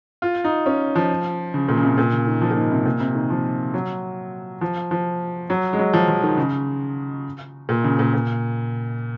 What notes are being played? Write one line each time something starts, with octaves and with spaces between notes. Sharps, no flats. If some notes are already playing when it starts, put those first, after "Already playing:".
F4
D#4
C#4
F3
C#3
A#2
C#3
C3
A#2
C#3
D#3
F3
A#2
G#2
C3
A#2
C3
D#3
F3
F#3
F3
F3
F#3
G#3
F#3
F3
F3
D#3
C#3
A#2
C#3
A#2
A#2